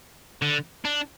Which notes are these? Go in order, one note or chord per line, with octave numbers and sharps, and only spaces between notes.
D3
D4